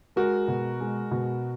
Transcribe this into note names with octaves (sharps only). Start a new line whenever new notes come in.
G#3 F#4 A#4
B2
G#3
B2